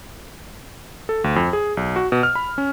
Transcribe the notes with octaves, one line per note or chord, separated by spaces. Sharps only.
A4
D2
F2
G#4
B1
F#4
B2
F6
B5
C#4